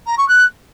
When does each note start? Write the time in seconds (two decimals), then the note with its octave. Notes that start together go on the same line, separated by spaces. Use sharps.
0.06 A#5
0.17 C#6
0.28 F#6